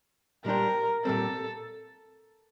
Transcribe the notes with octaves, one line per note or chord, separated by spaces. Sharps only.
A#2 G3 D4 G4 A#4 C5
A#2 G3 C4 A4